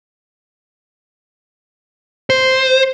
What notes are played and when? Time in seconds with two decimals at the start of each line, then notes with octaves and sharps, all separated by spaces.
2.30 C5